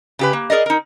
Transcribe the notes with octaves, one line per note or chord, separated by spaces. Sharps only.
C#3 G4 B4
A#3
G#4 A#4 D5 D#5
D#4 A#4